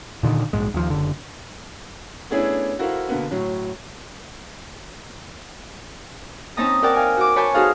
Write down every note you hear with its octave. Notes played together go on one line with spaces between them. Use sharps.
A#2 D3 D#3
A#1 G#2 G#3
D#2 F3
F#1 D3
A3 B3 C#4 D4 E4 G#4
E4 F#4 A4 A#4 C5 F5
B2 D3 A#3 B3
A2 F#3
C4 C#4 D#4 A5 A#5 D#6
A#4 D5 F#5 G5 A5
F5 G#5
F#4 D6
B4 C#5 G#5 A5 C#6 G6
D#4 F#4 G#4 A4 C5 F5